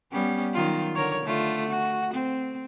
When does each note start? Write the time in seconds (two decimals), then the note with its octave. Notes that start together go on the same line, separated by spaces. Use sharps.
0.12 G3 B3 C#4
0.54 D#3 F#3 F4
0.95 D3 A#4 C#5
1.24 D3 A3 F4
1.69 F#4
2.14 C4